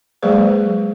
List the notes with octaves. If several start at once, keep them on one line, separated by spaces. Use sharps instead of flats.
F#3 G#3 A#3 G#4 B4 C5